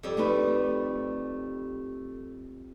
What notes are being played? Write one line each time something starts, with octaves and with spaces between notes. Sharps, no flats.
F2 G3
A3 D#4 B4